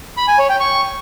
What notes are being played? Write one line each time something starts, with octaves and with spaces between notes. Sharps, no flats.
B5
G#5
C#5
G5
C#6